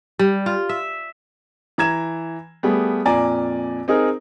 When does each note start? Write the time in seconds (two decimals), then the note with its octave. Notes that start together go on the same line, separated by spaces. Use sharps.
0.19 G3
0.46 F4
0.69 E5
1.78 E3 A#5 G#6 E7
2.63 G3 A3 B3 G#4
3.05 F2 A#2 D5 G#5 A#5
3.88 C4 D#4 G#4 A#4